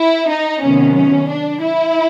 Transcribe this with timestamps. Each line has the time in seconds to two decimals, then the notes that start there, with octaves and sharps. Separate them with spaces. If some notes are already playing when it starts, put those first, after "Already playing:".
Already playing: E4
0.28 D#4
0.62 C3 D#3 F#3 B3 C#4
0.95 C#4
1.29 D4
1.62 E4